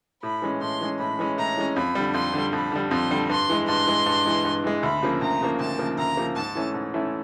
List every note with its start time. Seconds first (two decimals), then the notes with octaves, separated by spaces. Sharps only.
0.23 A2 B5
0.42 E3 G#3 C#4
0.61 A2 C6
0.81 E3 G#3 C#4
0.99 A2 B5
1.19 E3 G#3 C#4
1.38 A2 A#5
1.57 E3 G#3 C#4
1.76 F2 B5
1.95 D3 G3
2.14 F2 C6
2.34 D3 G3
2.53 F2 B5
2.72 D3 G3
2.91 F2 C6
3.11 D3 G3
3.29 G2 C6
3.49 E3 G#3
3.67 G2 C6
3.87 E3 G#3
4.06 G2
4.26 E3 G#3
4.45 G2
4.64 E3 G#3
4.83 D2 B5
5.02 C#3 F3 A#3
5.21 D2 A#5
5.41 C#3 F3 A#3
5.60 D2 A5
5.79 C#3 F3 A#3
5.98 D2 A#5
6.17 C#3 F3 A#3
6.36 G#2 A5
6.55 E3 A3 C#4 E4
6.74 G#2
6.94 E3 A3 C#4 E4